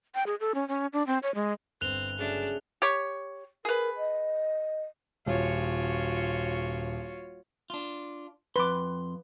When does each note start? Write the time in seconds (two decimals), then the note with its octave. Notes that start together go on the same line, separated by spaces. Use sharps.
0.15 G5
0.27 G#4
0.40 A4
0.55 C#4
0.69 C#4
0.93 D4
1.07 C4
1.23 C#5
1.35 G#3
1.81 G1 C4 F#6 F7 G7
2.19 C#3 F#3 A3 D4
2.82 G4 C#5
3.65 G#4 A#4 B4
3.96 D#5
5.26 D#1 F4 F#4 C#5
7.70 D4 F4
8.56 F2 B4 C6 D6